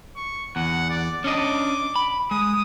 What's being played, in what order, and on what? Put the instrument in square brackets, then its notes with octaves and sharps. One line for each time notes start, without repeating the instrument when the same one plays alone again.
[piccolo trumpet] C#6
[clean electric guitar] E2 [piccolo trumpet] F#5
[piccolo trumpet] D5
[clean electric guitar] C#4 D4 D#5 [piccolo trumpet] D6
[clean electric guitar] B5
[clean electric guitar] G#3 [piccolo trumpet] D#6